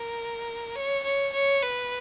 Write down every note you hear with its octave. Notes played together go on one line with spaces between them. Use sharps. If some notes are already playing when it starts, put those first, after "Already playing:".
Already playing: A#4
C#5
C#5
C#5
B4